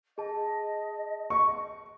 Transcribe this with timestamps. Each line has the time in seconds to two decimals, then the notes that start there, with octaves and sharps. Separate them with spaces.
0.18 G#4 D#5 A5
1.30 C#6